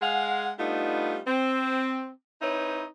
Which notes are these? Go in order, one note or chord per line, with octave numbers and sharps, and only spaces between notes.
G#3 F5 F#5
G3 A3 B3 D4 D#4 F4
C4
C4 D#4 E4 B4 C#5